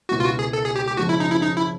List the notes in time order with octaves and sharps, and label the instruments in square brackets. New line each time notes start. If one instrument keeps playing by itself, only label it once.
[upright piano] C#2 B2 F#3 B3 E4 [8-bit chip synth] F#4
[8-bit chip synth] F4
F#4
G#4
A4
G#4
G4
G4
[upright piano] F#1 F#2 C#3 F3 G#3 [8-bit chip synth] F#4
[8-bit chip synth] E4
D#4
E4
D#4
E4